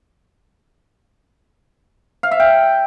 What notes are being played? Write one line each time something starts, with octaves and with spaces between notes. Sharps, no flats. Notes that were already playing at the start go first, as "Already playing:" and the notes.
F5
E5
G5